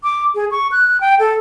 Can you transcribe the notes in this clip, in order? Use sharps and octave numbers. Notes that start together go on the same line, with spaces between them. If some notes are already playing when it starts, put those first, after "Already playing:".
D6
G#4
C#6
F#6
G5
A4